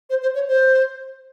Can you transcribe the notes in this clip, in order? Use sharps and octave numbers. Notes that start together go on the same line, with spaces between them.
C5
C5
C#5
C5